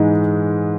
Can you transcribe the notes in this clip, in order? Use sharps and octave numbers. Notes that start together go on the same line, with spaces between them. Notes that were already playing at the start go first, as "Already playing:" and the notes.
Already playing: G#2 E3 G#3 D#4